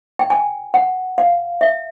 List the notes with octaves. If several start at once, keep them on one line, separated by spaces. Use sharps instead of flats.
G5
G#5
F#5
F5
E5